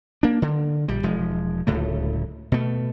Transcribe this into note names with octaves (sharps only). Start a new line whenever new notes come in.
A#3 D4
D3
A#1 G3
E1 F3 G#3
D1 C#2 A2 A3
B2 A3